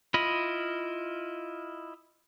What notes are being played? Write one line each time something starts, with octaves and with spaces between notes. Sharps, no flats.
E4 F4 D#5 B5